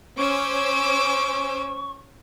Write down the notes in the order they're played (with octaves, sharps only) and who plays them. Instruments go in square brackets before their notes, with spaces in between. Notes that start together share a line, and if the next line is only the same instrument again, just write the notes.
[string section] C#4 C5 G#5 [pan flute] C#6 [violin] D6 E6